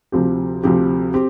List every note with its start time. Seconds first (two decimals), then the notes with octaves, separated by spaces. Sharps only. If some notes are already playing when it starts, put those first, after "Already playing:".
0.12 D2 C3 F3 C4 G4
0.64 D2 C3 F3 C4 G4
1.14 C4 G4